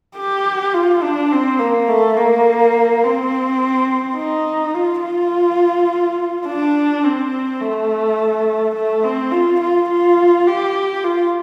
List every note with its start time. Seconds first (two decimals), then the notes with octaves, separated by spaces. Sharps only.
0.18 G4
0.74 F4
1.03 D4
1.32 C4
1.59 A#3
1.88 A3
2.17 A#3
3.04 C4
4.17 D#4
4.75 F4
5.03 F4
6.47 D4
7.04 C4
7.61 A3
8.75 A3
9.04 C4
9.32 F4
9.60 F4
9.89 F4
10.47 G4
11.04 F4